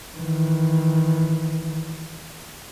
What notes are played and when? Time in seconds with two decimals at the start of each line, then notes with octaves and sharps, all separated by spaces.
0.16 D#3 E3